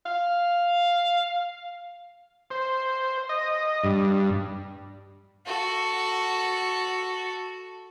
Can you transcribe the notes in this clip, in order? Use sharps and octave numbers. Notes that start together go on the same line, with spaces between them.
F5
C5
D#5
G2
F#4 A4